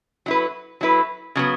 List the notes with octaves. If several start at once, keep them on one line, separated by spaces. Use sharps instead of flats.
F#3 E4 B4
F#3 E4 B4
C#3 F#3 B3